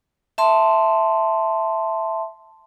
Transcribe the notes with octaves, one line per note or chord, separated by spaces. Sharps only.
E5 A5 C6